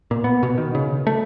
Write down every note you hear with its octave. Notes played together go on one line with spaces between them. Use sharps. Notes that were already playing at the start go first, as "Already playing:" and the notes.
A#2
B3
B2
D#3
C#3
A3